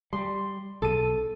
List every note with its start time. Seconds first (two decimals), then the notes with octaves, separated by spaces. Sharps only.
0.13 G3 C6
0.82 B1 A4 D#7